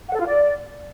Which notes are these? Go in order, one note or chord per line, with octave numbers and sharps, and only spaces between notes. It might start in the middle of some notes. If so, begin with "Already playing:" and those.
F#5
A4
F4
D5